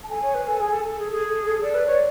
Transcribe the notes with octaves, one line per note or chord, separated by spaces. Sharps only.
A5
A4 G#5
C#5
B4
A4
G#4
A4
A4
G#4
G#4 A4
A4
A4
A4 D5
B4
C#5